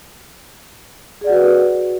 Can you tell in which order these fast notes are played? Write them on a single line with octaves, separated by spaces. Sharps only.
G#4 D5 F#5 F#4 B4